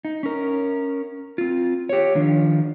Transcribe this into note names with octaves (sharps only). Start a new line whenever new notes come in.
D#4
C#4 A#4
C4 F4
G4 C#5
D#3 F3 D4